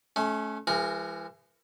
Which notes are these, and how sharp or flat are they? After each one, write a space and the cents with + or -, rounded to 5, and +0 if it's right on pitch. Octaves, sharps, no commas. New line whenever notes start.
A3 -30 C#4 +0
E3 +30 G#3 -30 A#4 +0